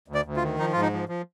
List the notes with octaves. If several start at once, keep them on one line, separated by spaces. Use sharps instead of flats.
D2
D5
D2
F4
D#3
F3 D#4
G#2 F4
D#4
F3
F3